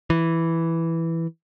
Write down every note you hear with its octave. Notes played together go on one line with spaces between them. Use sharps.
E3